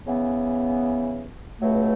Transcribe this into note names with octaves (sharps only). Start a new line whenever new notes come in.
C#3 E3 B3
C#2 B2 F#3 A3